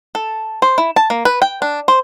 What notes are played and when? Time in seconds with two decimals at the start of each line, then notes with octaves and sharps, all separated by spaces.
0.15 A4
0.62 C5
0.78 E4
0.96 A5
1.10 A#3
1.25 B4
1.42 G5
1.62 D4
1.88 C5